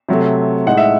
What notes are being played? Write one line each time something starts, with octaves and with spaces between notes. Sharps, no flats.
C3 F#3 A3
A2 G#3 D#4 F#5
E5